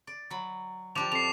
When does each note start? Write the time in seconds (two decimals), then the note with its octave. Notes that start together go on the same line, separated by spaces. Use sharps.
0.07 D5
0.30 F#3 B5
0.95 F3 D4 G4 D6 F7
1.12 F2 C7 F7